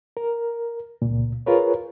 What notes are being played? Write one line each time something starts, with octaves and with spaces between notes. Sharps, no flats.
A#4
C#2 A#2
F4 G#4 A#4 B4 C#5